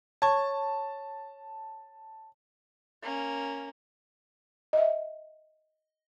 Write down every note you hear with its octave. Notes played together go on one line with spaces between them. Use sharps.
C#5 A5 C#6
A#3 C#4
D#5 E5